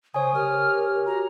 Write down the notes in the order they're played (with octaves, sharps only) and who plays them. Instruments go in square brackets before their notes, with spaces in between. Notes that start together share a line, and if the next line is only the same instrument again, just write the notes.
[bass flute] C#3 [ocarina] C5 [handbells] C#5 G#5 [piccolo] D#6
[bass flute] G4 [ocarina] A#4 [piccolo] F6
[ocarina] F#4 [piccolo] A#5